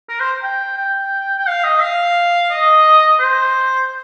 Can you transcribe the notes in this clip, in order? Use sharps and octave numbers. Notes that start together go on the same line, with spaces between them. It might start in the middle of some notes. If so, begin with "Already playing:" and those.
A#4
C5
G5
G5
G5
F5
D#5
F5
D#5
C5